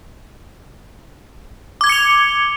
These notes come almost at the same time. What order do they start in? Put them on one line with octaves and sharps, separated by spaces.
D6 G#6 G7 C#7 F7